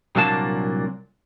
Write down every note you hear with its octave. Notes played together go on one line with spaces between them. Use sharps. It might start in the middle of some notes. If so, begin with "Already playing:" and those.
C2 A#2 F#3 A#3 D4 A5